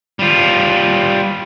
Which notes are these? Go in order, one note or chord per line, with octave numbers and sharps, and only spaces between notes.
G3 F4